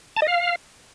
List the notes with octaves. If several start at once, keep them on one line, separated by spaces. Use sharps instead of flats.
A5
D#5
F5